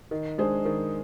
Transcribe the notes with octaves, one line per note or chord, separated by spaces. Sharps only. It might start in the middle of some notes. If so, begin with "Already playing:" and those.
D#3
G#3 D4 G#4 C5
D#3